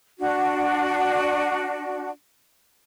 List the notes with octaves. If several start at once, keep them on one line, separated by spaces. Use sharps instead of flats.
D4 F#4